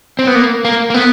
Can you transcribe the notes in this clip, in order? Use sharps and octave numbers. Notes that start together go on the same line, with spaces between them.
C4
B3
A#3
A#3
A#3
B3